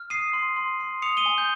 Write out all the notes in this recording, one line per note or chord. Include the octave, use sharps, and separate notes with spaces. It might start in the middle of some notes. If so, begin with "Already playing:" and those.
Already playing: F6
D#6 C7 D#7
C6
C6
C6
D#6 C#7 F7
D#7 G7
G#5
G6